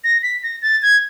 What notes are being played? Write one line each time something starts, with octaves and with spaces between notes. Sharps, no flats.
A#6
B6
A#6
A6
G#6